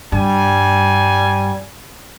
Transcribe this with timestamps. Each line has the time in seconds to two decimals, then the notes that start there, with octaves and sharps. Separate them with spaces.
0.12 G2 G3 G#5